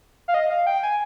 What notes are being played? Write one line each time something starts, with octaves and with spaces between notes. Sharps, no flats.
F5
D#5
F5
G5
G#5